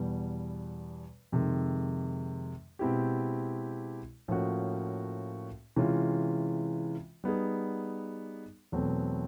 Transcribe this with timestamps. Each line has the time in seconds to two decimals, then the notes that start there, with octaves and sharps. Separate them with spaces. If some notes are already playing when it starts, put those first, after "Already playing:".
Already playing: E2 B2 G3
1.32 F2 C3 D#3 G#3
2.79 B2 G#3 C4 E4 G4
4.28 A2 F3 A#3 C#4 F#4
5.76 C3 E3 G#3 C#4 F4
7.24 G3 B3 D#4 G#4
8.72 E2 B2 F#3 A3 C4